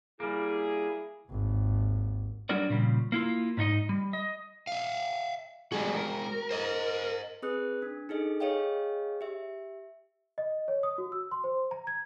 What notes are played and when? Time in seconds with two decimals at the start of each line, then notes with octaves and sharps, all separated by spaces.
0.20 G3 A#3 E4 G#4
1.28 G#1 D#2
2.49 F#3 G3 D4 F#4 A#4 D5
2.70 A#2 C#3 F3 G3
3.12 A#3 E4 F4
3.57 G#2 D4 D#4 D#5
3.89 G3
4.13 D#5
4.67 E5 F5
5.72 G3 G#3 F#4 G#4
5.95 A#4
6.51 C5 D#5
7.42 C4 G#4 B4 D#6 F#6
7.82 D4
8.09 D#4 G#4 A4 D#5
8.40 G#4 C#5 D#5 F5 G5
9.21 G4 E5
10.38 D#5
10.68 C#5
10.83 D#6
10.98 F#4
11.12 E6
11.31 C6
11.44 C5
11.71 A#5
11.87 G#6